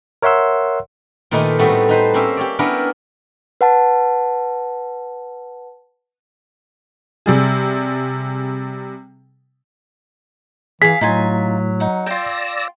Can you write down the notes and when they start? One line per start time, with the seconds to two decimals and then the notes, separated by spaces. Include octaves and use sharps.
0.22 A#4 C#5 E5 F#5 C6 E6
1.31 A#2 D#3 A3 D#4 B4
1.59 A2 G3 A3 B3 C4 F#4
1.89 D#4 B4 C5
2.14 A#3 C4 C#4 E5
2.37 G4 C#5 D5
2.59 B3 C#4 D4 E4 A#4
3.61 B4 F#5 A5
7.26 C3 G3 G#4
10.82 E3 G#4 F5 B6
11.01 A2 F#3 D#4 F4 G#5
11.80 D#4 F#5
12.06 F4 D5 G5 E6 A#6